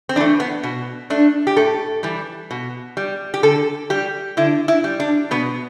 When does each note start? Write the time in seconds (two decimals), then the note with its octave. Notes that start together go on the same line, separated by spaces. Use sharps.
0.09 C4
0.16 E3 A3 D4
0.40 B3
0.64 B2
1.10 A3 D4
1.47 G4
1.57 A2 A4
2.03 E3 G3
2.51 B2
2.97 G3
3.34 G4
3.43 D3 A4
3.90 G3 G4
4.37 D3 E4
4.68 E4
4.84 G3
5.00 D4
5.31 B2 B3